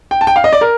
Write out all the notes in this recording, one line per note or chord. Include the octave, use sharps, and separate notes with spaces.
G5
A5
G5
F5
D#5
D5
A#4